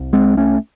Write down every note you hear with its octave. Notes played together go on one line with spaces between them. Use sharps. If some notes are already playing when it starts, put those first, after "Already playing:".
Already playing: C2
G#3 C4
A3 C#4